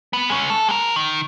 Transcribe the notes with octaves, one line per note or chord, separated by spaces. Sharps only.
B3
G#3 C#4
A4
G#3 A#4
D#3